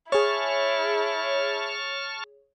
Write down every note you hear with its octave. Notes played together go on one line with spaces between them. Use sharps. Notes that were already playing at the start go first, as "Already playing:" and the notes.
E4 G#4 C#5 A5 C#6 F6